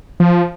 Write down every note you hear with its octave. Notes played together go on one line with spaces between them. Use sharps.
F3